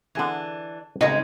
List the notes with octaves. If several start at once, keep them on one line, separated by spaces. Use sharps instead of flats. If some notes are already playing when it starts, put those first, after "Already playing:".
D3 E3 D4 G#4 A#5
G#1 D2 C#3 G#3 D#4